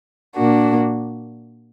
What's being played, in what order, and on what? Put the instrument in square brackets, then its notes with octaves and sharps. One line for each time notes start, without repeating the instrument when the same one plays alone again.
[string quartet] A#2 A#3 D4 F#4